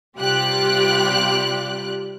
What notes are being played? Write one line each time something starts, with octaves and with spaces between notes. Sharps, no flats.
C3 G3 F4 G4 F#6